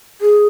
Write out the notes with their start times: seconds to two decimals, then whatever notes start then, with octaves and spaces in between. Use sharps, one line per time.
0.21 G#4